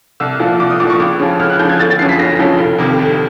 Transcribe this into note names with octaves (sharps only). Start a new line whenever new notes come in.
C2 E6
A#2 F3
C2 D6
D#6
A#2 F3 D6
C#6
C#2 D6
C#3 F3
C#2 F6
F#6
C#3 F3 G6
G#6
G1 A6
A6
F#2 C#3 F3 C7
B6
G1 A#6
F#2 C#3 F3
F1
F2 C3 D#3
F1